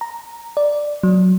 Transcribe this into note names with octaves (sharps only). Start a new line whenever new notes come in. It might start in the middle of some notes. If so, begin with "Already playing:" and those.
A#5
D5
F#3